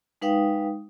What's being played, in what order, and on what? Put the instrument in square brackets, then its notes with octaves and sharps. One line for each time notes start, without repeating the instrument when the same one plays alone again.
[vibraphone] G#3 D#4 B4 F5 G5 D#6